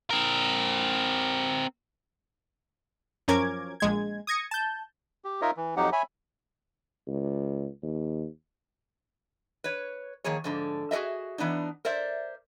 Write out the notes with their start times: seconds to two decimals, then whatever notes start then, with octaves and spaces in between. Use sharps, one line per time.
0.11 C4 A#4
3.28 F#2 F3 C#4 A#4 D6 G#6
3.80 A#1 G#3 G#6
4.27 D#6 G#6 A#6 C#7
4.51 A5 G6
5.25 G4
5.42 D#4 F4 A#4 C#5 D#5 E5
5.57 E3
5.77 F2 F#3 D#4 G4 F#5
5.93 C#5 E5 G#5 B5
7.07 C#2
7.82 D#2
9.64 B4 C#5
10.24 D#3 F3 A#3 G#4 C#5
10.44 G#2 D3 F3
10.91 F#4 G#4 A#4 D#5 E5
11.38 E3 B3 D4 D#4
11.85 A#4 C5 D5 E5